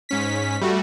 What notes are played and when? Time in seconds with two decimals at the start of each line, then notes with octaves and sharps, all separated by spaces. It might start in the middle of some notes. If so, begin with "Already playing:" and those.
0.09 G#2 C#4 B6
0.61 G3 A3 F#4